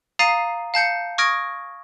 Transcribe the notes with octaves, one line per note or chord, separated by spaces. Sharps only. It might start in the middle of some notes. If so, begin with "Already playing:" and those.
F5 A#5 D#6 A6 C7 D#7
F5 A5 G6 C#7
C#6 D#6 F6 G#6 A#6 D7